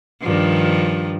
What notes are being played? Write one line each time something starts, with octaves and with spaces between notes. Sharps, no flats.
G2 D#3 F3